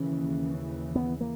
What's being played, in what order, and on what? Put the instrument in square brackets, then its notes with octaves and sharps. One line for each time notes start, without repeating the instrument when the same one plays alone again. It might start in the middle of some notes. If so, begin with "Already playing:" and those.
Already playing: [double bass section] D#2 C#3 E3 [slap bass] C#4
[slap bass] B3
A#3